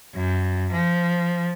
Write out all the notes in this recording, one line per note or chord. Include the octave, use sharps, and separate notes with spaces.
F#2
F3